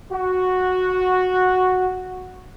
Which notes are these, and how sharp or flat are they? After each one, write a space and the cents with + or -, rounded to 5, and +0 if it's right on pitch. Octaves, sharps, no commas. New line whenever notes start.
F#4 -5